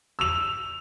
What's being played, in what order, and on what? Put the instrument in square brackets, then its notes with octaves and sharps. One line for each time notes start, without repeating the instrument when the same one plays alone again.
[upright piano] E6 F7